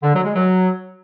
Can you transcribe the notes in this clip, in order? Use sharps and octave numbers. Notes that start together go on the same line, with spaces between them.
D3
F#3
G#3
F#3